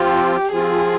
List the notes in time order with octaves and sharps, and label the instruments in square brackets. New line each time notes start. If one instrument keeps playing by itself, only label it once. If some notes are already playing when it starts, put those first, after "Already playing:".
Already playing: [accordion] F3 C4 F4 [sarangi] G4
[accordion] F3 C4 F4 [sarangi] G#4